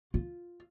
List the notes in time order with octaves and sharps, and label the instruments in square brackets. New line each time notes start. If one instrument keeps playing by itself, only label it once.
[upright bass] F4